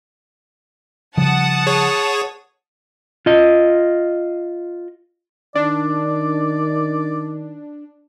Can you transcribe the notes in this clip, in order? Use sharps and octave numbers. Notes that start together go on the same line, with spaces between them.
C#3 F3 G3 F#5 A5 D#6
G#4 C#5 C#6
F4 D#5
D#3 D4 D5